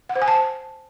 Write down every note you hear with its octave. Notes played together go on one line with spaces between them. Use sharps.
F#5
C5
G#5
A5